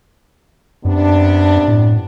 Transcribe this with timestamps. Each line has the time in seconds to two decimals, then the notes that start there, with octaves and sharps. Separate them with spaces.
0.85 F#2 C3 B3 D4
1.68 A2